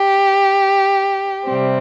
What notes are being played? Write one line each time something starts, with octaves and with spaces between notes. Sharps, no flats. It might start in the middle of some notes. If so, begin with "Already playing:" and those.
Already playing: G4
C3 G3 C4